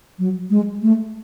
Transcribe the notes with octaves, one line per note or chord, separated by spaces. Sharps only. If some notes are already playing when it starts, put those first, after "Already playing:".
F#3
G#3
A3